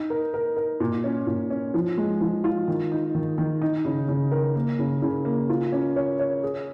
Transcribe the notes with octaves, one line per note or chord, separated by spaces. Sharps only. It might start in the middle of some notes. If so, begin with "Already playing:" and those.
Already playing: D#4
A#4
A#4
A#4
A#2
C#4
A#2
C#4
F3
G#3
F3
F4
D#3
D#4
D#3
D#3
D#4
C#3
C#3
A#4
A#3
C#3
C#3
A#3
F4
C#4
C#5
C#5
G#4